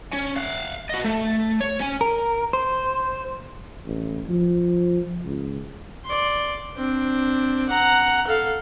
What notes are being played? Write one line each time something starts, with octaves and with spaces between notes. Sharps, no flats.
C#4
F5 F#5
F#4 D#5
A3
C#5
C#4 G#5
A#4
C5
A1
F3
C#2
D5 C6
C4 D4
F#5 A#5
A4 F5